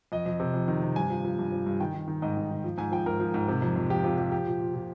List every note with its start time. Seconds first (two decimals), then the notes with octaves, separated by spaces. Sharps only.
0.12 F2 D#5
0.26 F2
0.40 C3
0.54 F2
0.68 D#3
0.82 C3
0.96 G2 G#5
1.10 F3
1.25 F3
1.39 G2
1.52 F3
1.66 G2
1.80 D#3 G5
1.94 D#3
2.08 D#3
2.22 G#2 D#5
2.37 D#3
2.51 D#3
2.64 F3
2.78 G#2 G#5
2.92 F3 G5
3.06 G#2 A#4
3.20 F3
3.34 G#2
3.48 C3
3.62 F2
3.76 F2
3.90 F3 G4
4.04 C3 F4
4.18 F3 G4
4.32 F3 G4
4.47 A#2
4.60 A#2
4.74 A#2